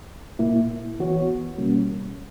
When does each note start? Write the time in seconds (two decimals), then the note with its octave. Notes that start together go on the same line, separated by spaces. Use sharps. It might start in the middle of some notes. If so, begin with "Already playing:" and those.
0.39 A#2 A#3 E4
1.00 E3 B3 F#4 C#5
1.58 B2 G3 A#3 C#4